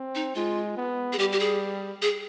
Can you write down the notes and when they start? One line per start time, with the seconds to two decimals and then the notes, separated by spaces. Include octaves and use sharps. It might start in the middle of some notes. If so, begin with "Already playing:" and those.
Already playing: C4
0.15 D#4
0.35 G#3 F4
0.77 B3
1.13 G#4
1.18 G3 G4
1.32 G4
1.40 G#4
2.02 G#4